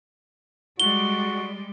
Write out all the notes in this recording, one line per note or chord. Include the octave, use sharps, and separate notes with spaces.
G3 G#3 F#4 D5 G7